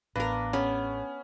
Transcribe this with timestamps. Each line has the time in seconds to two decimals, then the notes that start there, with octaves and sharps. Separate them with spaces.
0.16 A1 B3 D4 A#4 B4 F5 A#6
0.53 B3 C#4 G#4 C#5